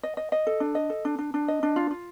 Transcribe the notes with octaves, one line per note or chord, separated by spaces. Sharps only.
D#5
D#5
D#5
A4
D4
D#5
A4
D4
D4
D4
D#5
D4
F4
F4